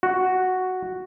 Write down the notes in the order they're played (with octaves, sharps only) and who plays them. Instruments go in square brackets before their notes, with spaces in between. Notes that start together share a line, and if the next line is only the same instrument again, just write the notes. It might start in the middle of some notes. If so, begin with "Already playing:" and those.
[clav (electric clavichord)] F#4